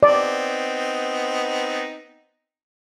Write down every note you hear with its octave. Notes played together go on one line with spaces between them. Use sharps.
B3 C4 D#4 D5